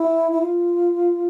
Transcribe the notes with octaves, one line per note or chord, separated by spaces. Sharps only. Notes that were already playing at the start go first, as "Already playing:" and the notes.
Already playing: E4
E4
F4